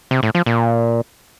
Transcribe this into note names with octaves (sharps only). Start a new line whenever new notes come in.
C3
A2
F3
A#2